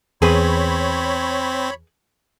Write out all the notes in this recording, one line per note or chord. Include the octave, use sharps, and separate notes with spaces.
E2 C4 G#4 B4 C#5 B5